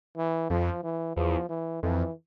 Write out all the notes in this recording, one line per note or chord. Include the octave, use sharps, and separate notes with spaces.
E3
F2 F3
E3
E2 F3
E3
F2 E3